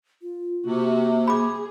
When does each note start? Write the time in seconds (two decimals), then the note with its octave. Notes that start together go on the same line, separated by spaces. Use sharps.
0.22 F4
0.66 C3 A#3 F#4
1.28 G#4 B5 D6